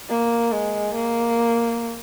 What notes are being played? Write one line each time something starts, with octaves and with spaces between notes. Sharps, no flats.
A#3
G#3
A#3